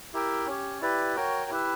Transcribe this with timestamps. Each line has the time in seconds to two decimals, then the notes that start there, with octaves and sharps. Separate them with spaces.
0.14 E4 G4 A#4 E5 G5
0.47 C#4 G4 C#5
0.81 E4 G4 B4 D5
1.16 F#4 A#4 C#5 G5
1.51 E4 G4 B4 E5